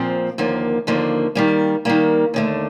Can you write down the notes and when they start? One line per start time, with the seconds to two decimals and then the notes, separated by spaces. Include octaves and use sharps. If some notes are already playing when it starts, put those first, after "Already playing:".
Already playing: A#2 F3 C4
0.38 D#2 D3 F3 A#3
0.87 D#2 D3 F3 A#3
1.35 D#3 G3 A#3
1.85 D#3 G3 A#3
2.34 D#2 D3 A3